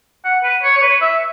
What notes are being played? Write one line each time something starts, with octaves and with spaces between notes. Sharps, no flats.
F#5
B4
C#5
C#5
B4
E5